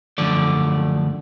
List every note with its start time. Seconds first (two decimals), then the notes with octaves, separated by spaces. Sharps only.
0.18 F#2 D3 F3 A3 D5